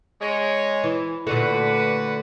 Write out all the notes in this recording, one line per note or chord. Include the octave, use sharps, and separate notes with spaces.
G#3 C#5
E3
A#2 D3 A3 F#4 B4